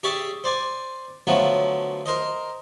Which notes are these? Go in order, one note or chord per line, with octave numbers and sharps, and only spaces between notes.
G4 G#4 C#5 D5 E5
C5 D5 G#5
D3 F3 F#3 A3 B3
A#4 C5 D#5